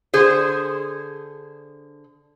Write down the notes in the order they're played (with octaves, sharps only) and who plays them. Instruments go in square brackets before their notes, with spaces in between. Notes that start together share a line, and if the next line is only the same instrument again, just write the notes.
[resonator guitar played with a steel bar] D3 G#4 C5